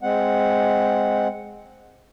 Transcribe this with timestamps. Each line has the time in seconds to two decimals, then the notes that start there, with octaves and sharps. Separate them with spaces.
0.03 G#3 C4 F#5